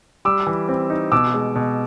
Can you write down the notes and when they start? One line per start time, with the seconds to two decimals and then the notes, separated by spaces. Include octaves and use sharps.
0.25 G3 D6 E6
0.47 E3
0.69 C4
0.90 D#4
1.12 B2 D6 E6
1.34 G#3
1.55 B2